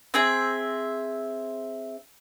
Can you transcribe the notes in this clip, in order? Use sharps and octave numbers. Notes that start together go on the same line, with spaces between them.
C4 G#4 E5